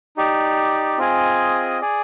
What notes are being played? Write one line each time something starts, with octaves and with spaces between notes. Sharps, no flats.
D#4 G4 D5
C4 F4 G#4 D#5 G#5
G#4 D5 G#5